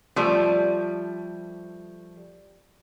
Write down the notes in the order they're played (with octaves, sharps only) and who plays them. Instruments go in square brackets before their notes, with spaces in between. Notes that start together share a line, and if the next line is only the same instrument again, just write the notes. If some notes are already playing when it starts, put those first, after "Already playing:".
[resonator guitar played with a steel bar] F3 G3 A3